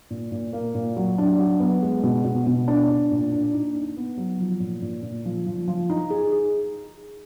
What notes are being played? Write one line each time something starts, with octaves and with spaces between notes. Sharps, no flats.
A#2
A#2
A#3
A#2
F#3
D4
F#3
B3
G#3
B2
B2
B2
D4
D4
A#2
D4
D#4
D#4
B3
F#3
F3
A#2
A#2
A#2
F3
F3
F3
D#4
G#4
G#4